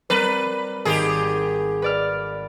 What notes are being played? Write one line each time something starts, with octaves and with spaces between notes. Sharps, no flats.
G3 C4 A#4 B4
G#1 G4 G#4
B4 D5 F6